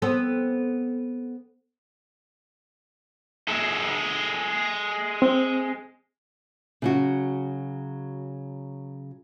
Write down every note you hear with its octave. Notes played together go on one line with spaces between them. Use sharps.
B3 C4 A4
G#3 A4
C4
C#3 F#3 F#4